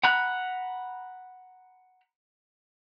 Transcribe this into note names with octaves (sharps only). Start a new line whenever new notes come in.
F#5 A#5 B5 F#6